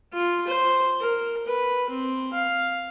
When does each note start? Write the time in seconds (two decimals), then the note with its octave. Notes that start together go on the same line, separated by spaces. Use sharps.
0.13 F4
0.47 C5
1.00 A#4
1.47 B4
1.89 C4
2.33 F5